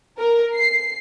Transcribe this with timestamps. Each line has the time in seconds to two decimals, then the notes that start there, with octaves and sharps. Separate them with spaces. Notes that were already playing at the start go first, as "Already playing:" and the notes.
0.19 A#4
0.55 C7